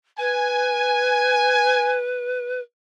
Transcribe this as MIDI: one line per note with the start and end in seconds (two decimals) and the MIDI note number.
0.18 2.61 71
0.18 1.95 80